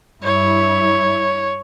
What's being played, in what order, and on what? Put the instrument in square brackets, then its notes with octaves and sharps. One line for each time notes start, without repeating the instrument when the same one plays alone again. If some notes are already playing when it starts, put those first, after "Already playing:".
[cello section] G2 E4 [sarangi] C#5